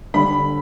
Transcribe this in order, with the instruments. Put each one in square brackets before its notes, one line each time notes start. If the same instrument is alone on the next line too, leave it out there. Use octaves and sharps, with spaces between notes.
[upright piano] D3 G3 B5